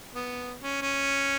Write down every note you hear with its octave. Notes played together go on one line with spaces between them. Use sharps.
B3
C#4
C#4